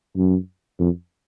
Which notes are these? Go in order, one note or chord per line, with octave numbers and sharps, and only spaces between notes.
F#2
F2